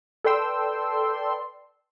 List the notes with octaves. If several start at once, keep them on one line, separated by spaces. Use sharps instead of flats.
A4 B4 D5 G5 C6 E6